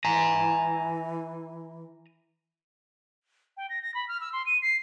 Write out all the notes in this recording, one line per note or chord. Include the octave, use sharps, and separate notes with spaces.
E3 G#5 A#5
G5
A#6
A#6
B5
F6
E6
C6
D#7
C7